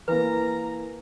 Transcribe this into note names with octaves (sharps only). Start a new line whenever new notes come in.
E3 A#3 B4 A#5